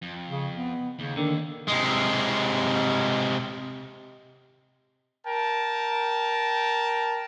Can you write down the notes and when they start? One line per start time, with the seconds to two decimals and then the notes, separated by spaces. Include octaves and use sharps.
0.02 F2
0.29 C#3
0.53 B3
0.99 D#2 C#3
1.17 D3 D#3
1.68 C3 G#3
5.25 A#4 G5 A5